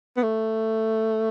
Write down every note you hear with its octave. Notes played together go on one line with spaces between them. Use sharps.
B3
A3